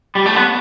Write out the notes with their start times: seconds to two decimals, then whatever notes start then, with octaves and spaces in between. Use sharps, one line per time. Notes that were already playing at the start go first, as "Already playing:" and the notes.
0.15 G3
0.26 A3
0.36 B3